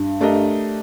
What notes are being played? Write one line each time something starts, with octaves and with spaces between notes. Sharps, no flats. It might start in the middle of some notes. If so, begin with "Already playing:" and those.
Already playing: G2
A3 D4 G4 A#4 D#5